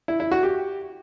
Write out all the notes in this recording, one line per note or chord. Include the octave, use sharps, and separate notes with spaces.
E4
E4
F#4
G4